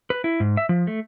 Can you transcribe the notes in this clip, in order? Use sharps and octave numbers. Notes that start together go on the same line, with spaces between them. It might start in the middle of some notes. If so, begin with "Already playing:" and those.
B4
E4
G#2
E5
F3
A3